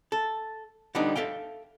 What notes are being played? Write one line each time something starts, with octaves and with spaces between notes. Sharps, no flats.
A4
D3 G3 B3 D4 D#4
A4 E5 F5 G5